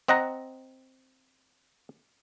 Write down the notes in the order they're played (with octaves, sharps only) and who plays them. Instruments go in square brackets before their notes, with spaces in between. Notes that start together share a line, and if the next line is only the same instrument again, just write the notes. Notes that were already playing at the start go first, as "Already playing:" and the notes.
[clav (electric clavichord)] C4 D#5 F#5 A#5